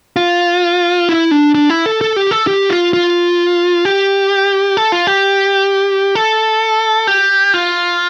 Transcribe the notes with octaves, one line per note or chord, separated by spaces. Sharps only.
F4
E4
D4
D4
E4
A4
A4
G4
A4
G4
F4
F4
G4
A4
F4
G4
A4
G4
F4